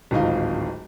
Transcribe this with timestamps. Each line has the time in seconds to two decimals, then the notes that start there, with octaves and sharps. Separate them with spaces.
0.11 D1 G#1 D#4 F4